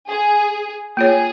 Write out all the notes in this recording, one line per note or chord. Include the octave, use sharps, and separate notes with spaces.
G#4
A#3 F4 G#4 C#5